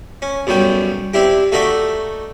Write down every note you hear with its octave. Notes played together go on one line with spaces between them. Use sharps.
C#4
B1 F#2 F#3 G3 G5
C4 D4 E4 G4
A3 D#4 F#4 A4 D5 E5